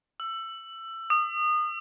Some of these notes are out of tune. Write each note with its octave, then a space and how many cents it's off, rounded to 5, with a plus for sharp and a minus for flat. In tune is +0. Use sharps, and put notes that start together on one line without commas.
E6 +20
D#6 -25